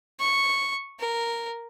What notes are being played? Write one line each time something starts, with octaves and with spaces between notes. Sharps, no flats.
C#6
A#4